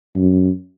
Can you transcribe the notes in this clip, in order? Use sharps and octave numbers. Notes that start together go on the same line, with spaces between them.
F#2